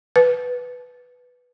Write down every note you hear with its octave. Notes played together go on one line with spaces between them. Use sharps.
B4